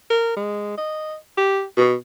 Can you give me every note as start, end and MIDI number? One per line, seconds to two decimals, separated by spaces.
0.10 0.35 70
0.37 0.73 56
0.78 1.16 75
1.37 1.63 67
1.77 1.94 47